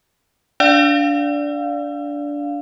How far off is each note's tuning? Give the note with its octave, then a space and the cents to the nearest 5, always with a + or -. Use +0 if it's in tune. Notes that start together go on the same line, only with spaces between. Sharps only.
D4 -20 D5 +0 F5 +0